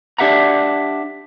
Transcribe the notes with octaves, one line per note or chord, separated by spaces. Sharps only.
D4 G4 E5 F#5 A#5